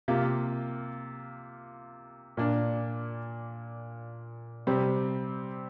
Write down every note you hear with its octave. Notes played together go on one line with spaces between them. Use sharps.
C3 A#3 F4
A#2 A#3 D4
C3 G3 C4